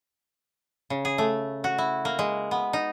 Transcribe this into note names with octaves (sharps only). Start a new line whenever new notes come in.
C#3
G#4
A3
F#4
E4
A#3
G#3
B3
D#4